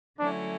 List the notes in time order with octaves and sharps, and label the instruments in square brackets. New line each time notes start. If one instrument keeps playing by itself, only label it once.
[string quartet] D3 F#3 A3 C#4 E4 [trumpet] D4